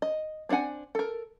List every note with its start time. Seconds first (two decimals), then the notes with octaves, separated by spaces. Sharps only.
0.02 D#5
0.49 C4 D4 C#5 F#5 G#5
0.95 A4 A#4